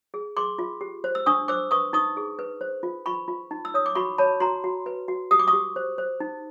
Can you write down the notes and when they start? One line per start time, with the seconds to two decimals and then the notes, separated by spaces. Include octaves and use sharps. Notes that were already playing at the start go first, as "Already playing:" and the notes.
0.14 G#4
0.37 G#4 C6 D6
0.59 F4
0.81 G4
1.04 C5
1.15 E6
1.26 D4 C#6 D#6
1.48 C5 D6 E6
1.71 B4 C#6 D#6
1.93 D#4 C#6 D#6
2.17 G#4
2.39 B4
2.61 C5
2.83 F4
3.06 F4 B5 C#6
3.28 F4
3.51 D#4
3.65 E6
3.74 C#5 D#6
3.86 D6
3.95 F#4 B5 C#6
4.18 C#5 A5 B5
4.40 F#4 A#5 C6
4.64 F#4
4.86 B4
5.08 F#4
5.31 G4 D#6
5.39 D6
5.47 C#6 D#6
5.53 G4
5.76 C5
5.98 C5
6.20 D#4